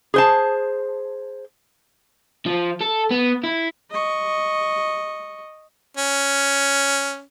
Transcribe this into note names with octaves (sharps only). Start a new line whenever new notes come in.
G#4 C5 A5
F3
A4
B3
E4
D#5 C#6
C#4